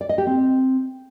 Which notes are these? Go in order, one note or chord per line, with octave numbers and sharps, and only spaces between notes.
D5
D#5
G4
C4